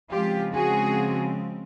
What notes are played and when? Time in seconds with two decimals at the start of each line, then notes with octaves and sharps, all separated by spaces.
0.11 C#3 F3 G#3 C4 F4 G4
0.54 F#4 G#4